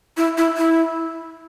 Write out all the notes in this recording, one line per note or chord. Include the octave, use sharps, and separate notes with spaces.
E4
E4
E4